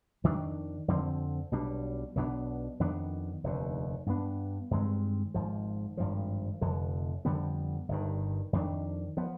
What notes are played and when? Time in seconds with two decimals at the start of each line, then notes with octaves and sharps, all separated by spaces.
0.24 F2 D#3 B3 D4
0.88 F2 D3 F3 C4
1.51 B1 B2 G3 D4
2.15 B1 B2 B3 D4
2.80 F2 D#3 B3 D4
3.44 F1 D#2 D3
4.06 G2 D#3 B3 D4
4.71 G2 D#3 G#3 C4
5.34 G#1 G#2 F3
5.97 G#1 G2 F3
6.61 F1 F2 D3
7.25 F2 D3 G3 B3
7.89 G1 G2 D#3
8.53 F2 D#3 B3 D4
9.17 F3 B3